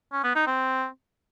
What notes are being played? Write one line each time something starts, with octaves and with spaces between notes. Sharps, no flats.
C#4
B3
D#4
C4